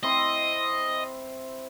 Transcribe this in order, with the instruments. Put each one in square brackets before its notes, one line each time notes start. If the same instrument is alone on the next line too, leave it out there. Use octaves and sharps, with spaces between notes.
[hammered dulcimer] C4 E4 C6 [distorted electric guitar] D#5